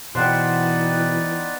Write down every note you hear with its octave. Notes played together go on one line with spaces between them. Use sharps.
B2 E3 D#4 B4 C5 D5 F#5 G5